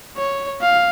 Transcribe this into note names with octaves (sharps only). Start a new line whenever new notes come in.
C#5
F5